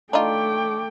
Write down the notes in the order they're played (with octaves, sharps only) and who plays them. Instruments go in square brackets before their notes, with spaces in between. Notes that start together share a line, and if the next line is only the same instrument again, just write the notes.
[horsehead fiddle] A3 G5 [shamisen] D4 D#4 F4 [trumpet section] C#5 D6